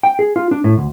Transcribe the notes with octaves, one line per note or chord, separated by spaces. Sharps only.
G5
G#4
F4
D4
A2
D2